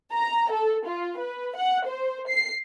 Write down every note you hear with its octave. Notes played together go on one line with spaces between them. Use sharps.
A#5
A4
F4
B4
F#5
C5
C7